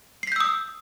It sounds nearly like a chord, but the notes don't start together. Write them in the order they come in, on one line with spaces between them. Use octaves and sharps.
C7 B6 G6 E6 D#6